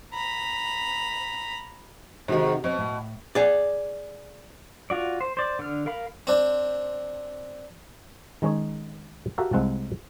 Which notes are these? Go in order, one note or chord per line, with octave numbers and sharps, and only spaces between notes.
A#5 B5
G#2 C3 D#3 F#4
B2 C4 C#5
A2
G#4 D5
F4 F#4 D5
C5
C5 D5
D3 F6
A#4 F5 B5
C4 D4
D#3 G#3 C#4 D#4 C#5
F#4 G4 A4 A#4 E5 F5
C2 G#3 C4 F5 F#5 A5